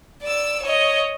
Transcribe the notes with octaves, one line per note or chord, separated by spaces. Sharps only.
D5 E6
C#5 D#5